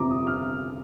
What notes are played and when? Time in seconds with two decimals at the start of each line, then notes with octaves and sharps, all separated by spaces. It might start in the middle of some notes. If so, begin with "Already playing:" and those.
Already playing: G1 F2 C3 A#5 D6
0.11 D#6
0.27 F6